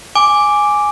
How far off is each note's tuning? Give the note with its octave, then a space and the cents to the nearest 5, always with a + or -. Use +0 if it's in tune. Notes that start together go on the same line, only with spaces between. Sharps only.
G#5 +0 D6 +0